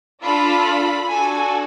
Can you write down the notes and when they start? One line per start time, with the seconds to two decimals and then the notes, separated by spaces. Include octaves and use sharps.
0.21 D4 F4 A4 B5
1.08 D4 F#4 A4 G#5